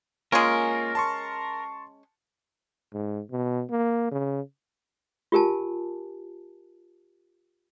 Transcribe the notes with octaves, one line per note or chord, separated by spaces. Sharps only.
G#3 A#3 C#4 F4 A#4
A5 C6 C#6
G#2
B2
A#3
C#3
F4 G4 A#4 G#5 A5